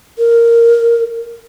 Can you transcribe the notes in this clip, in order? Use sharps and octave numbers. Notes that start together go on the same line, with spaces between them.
A#4